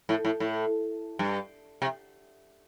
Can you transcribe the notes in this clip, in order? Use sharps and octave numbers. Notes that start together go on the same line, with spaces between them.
A2
A2
A2
G2
C3